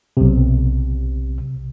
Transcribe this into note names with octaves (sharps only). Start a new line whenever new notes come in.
B1 C3